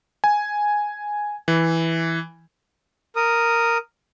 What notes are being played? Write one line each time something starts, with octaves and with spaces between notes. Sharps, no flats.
G#5
E3
A#4 D#6